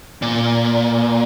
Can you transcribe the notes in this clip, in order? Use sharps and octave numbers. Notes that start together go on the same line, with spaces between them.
A#2